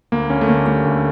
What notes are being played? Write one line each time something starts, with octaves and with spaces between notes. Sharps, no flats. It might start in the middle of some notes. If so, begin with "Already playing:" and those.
D2 A#3
D2 C#4
A3
D3 A#3
G3 A3
D2